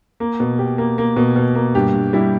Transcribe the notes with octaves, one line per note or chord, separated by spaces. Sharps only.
A#3
B2
B2 G4
A#3
A#3
B2
B2
A#3
G2 G4
G2
G3 E4